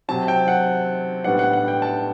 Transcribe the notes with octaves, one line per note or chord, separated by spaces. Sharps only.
C3 F#3 C4 A5
G5
F#5
A2 G3 B3 D4 F#5
F#5
F#5
G5
A5